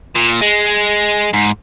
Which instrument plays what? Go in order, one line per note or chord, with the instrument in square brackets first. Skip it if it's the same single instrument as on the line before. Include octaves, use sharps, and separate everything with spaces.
[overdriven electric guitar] A#2
G#3
G#2